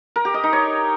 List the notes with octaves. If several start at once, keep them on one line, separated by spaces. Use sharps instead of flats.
A#4
G4
D#5
D#4
C#5